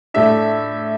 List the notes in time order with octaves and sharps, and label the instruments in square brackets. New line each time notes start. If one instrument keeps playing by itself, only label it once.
[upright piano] A2 A3 D4 E5